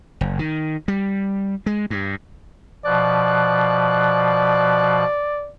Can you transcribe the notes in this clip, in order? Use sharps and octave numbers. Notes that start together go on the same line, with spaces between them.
F#1
D#3
G3
G#3
G2
B2 F3 D5 F#6